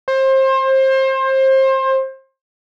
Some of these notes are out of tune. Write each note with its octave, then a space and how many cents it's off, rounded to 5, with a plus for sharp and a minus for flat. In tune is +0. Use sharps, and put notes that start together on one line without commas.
C5 +25